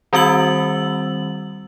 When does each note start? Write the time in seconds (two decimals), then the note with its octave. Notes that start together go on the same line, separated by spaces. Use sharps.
0.13 D#3 G3 C4 F#4 E6 F#7